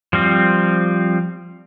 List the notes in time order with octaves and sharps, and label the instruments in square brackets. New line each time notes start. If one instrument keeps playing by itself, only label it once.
[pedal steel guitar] F3 G3 C4